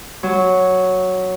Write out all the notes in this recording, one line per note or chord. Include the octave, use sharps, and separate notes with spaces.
F#3